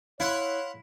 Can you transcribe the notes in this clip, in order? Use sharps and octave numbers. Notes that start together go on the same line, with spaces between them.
E4 C#5 F5 F#5 C6